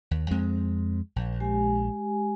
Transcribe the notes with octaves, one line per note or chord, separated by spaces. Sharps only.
D#2
F2 G#3 C4
A#1
G#3 G4 G#5